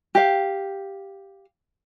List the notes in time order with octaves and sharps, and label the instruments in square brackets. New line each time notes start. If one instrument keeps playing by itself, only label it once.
[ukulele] G4 F5